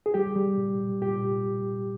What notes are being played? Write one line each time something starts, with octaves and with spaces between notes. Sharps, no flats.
G#4
G3 G4
G3
A#2
G3
A#2 G4